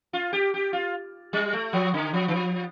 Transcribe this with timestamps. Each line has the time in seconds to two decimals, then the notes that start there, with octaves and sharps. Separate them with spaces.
0.13 F4
0.33 G4
0.54 G4
0.73 F4
1.33 G3
1.53 A3
1.73 F3
1.94 D3
2.13 F3
2.28 D#3
2.34 F3